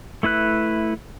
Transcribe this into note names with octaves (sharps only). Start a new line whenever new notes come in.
A3 E4 B4 F#6